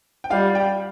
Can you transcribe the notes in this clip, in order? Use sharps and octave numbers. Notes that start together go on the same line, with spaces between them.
G5
G3 F4 F5
G4 G5